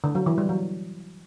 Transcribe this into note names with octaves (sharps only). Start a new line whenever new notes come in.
D3
F#3
E3
G3
F#3